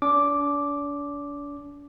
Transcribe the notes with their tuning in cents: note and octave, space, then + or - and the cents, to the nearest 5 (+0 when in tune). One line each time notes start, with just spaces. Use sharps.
D4 -40 D6 +0